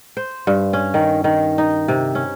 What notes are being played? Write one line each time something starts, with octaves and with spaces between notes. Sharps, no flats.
C5
G2
C#4
D#3
D#3
D#4
C3
C#4